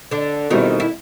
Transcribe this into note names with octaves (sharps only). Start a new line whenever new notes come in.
D3 D4
B2 D#3 G3 C4 D#4 E4
E4